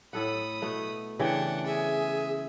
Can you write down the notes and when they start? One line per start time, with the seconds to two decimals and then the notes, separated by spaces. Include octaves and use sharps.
0.13 A2 A4 F#5 B5 D#6
0.62 B2 A3 B3
1.19 C#3 E3 D4 G4 F#5 G5
1.66 G#4 E5 G#5